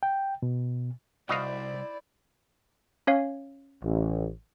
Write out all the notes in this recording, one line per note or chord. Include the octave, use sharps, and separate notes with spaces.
G5
B2
C2 E4 F#4 C5 D5 D#5 F5
C#4 C#5 F5
A1